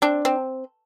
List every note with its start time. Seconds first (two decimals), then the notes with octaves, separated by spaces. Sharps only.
0.02 C4 D4
0.25 C4